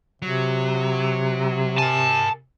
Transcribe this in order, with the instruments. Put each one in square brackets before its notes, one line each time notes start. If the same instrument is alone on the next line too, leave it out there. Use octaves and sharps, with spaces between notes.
[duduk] C3 [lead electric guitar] F#3
[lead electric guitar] A#4 G#5 [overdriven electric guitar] A5